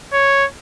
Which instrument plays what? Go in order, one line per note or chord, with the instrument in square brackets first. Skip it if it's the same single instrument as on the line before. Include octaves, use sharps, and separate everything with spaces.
[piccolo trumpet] C#5